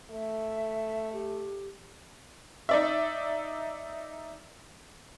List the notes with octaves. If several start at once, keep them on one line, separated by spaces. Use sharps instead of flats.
A3 E5
G4
D#4 D5 E5